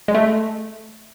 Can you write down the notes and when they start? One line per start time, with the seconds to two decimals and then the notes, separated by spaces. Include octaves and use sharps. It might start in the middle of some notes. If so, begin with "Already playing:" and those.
0.08 G#3
0.15 A3